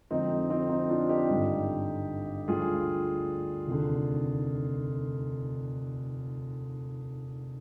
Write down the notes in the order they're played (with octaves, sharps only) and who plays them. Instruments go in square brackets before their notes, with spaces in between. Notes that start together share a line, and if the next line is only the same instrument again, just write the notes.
[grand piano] F2 D3 F3 G#3 C4 D#4
C4 D#4
C4 D#4
D4 F4
D#4 G4
G#1 G2 D3 G3
D2 D3 G3 F4 G#4
F1 D#2 D3